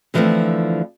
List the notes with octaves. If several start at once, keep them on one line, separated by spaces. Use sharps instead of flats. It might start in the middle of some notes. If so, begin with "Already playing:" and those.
D3 E3 F3 G3 A3 C4